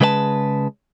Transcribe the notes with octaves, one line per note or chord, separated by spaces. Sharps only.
C#3 G#3 B4 D#5 A5